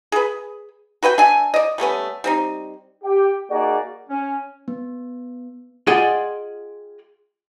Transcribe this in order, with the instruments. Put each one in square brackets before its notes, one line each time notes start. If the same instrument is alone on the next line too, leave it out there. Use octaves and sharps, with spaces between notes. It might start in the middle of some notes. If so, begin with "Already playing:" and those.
[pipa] G#4 B4
F#4 B4 F#5 G5
D4 E5 G#5
D5 D#5
G3 A3 B3 C#4
G3 C4 D#4
[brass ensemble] G4 G5
A#3 D#4 F#4 G#4 D5
[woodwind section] C#4
[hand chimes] B3
[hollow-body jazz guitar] F4 G#4 D5 D#5 F#5 G5